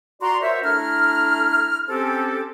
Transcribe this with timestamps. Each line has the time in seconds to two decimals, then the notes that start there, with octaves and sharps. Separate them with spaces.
0.21 F#4 D5 A#5 C6
0.42 F#4 A#4 C5 C#5 E5
0.63 A3 D4 E4 A#5 F6
1.88 C4 C#4 G4 A4